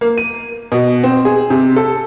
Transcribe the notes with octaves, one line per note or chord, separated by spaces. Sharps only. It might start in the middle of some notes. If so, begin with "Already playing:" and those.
A#3
D#7
B2
C4
G#4
C3
A4